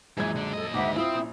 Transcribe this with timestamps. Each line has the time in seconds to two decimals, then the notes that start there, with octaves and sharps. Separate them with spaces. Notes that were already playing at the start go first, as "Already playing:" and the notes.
0.18 A#1 F#2 E3 G#3 G#6
0.36 D3 D4
0.53 D#2 A4 D#5
0.74 D2 G#2 E5 F#5 G5 D6
0.96 C4 E4 F4 E5 G5 D#6
1.14 A#1